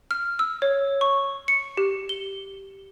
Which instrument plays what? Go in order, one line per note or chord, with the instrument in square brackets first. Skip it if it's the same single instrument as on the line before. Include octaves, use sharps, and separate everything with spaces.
[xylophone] F6
E6
C#5
C#6
C#7
G4
G7